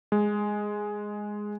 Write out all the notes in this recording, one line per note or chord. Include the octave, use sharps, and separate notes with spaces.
G#3